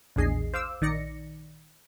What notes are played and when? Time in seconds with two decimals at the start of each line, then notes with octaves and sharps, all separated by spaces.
0.16 A#1 E2 D4 G#4 D#5 C7
0.53 C5 F5 D6 E6
0.81 A#1 D#3 D#4 D5 A#6 C#7